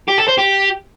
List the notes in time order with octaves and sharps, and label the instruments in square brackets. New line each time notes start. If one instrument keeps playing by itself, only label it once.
[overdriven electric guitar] G4
A4
C5
G4